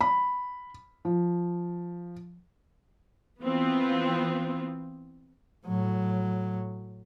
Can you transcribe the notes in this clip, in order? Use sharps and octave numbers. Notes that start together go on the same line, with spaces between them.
B5
F3
E3 B3 C4 F4
A2 F#3